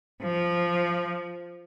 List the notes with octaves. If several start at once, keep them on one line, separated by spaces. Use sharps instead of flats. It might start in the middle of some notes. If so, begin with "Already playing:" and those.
F3